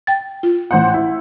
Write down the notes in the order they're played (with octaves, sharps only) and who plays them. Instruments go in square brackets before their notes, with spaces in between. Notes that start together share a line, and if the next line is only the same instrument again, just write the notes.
[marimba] G5 A6
F4
[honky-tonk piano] A1 C5 F#5
E4